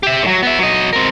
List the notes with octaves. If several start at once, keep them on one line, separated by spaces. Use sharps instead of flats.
G4 E5
A2 F#3
B3 E5
F#3 D#5
C4 A#4